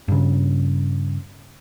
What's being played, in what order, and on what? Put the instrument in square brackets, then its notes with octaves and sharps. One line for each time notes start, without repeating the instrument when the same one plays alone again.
[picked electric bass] G2 C#3